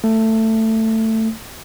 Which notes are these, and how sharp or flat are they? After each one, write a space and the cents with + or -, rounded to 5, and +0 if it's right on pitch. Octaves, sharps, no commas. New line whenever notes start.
A3 +15